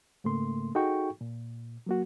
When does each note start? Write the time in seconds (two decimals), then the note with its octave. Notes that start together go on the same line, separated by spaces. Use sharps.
0.24 G#2 C#3 A3 A#3 C6
0.75 D#4 F#4 G#4 A4 G5 C#6
1.21 A#2
1.87 F#3 A#3 F#4